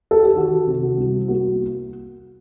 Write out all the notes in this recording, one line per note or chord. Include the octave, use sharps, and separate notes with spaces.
A4
G4
D#3 F#4
C3
F#4
C2
A#3 F#4